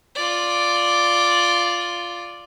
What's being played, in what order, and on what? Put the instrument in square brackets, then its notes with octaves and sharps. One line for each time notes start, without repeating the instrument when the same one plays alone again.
[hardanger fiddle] F4 D5